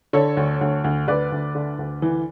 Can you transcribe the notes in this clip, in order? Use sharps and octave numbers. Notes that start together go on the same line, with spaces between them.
D3 A4 C#5
D2
D2
D2
D2 B4 D5
D2
D3
D2
E3